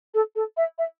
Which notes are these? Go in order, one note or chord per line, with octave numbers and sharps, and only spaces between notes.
A4
A4
E5
E5